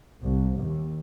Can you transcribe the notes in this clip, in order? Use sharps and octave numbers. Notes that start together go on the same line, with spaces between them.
C2
D#2